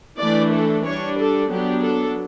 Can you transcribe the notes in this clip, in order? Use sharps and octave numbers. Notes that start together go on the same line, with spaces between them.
E3 A3 D4 D5
A4
G3 D4 C#5
A4
F#3 B3 D4 G4
A4